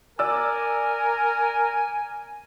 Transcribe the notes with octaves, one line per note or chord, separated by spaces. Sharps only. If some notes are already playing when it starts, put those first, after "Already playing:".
A#4 D5 G#5 D6 E6